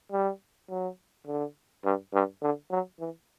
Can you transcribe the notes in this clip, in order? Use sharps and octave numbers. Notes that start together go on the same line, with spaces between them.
G3
F#3
D3
G2
G2
D3
F#3
E3